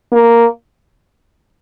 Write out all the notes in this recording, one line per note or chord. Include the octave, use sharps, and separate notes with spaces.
A#3